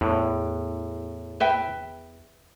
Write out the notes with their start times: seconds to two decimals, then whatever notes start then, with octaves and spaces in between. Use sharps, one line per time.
0.01 E2 A2
1.40 B4 E5 G5